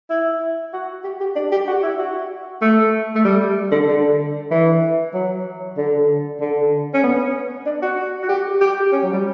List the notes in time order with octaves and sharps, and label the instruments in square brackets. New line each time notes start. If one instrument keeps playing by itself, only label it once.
[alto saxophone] E4
F#4
G4
G4
D4
G4
F#4
E4
F#4
A3
A3
G3
D3
D3
E3
F#3
D3
D3
C#4
B3
D4
F#4
F#4
G4
G4
C#4
F#3
G3